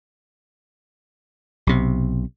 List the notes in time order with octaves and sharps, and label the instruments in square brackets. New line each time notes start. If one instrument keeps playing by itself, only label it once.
[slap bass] B1 C3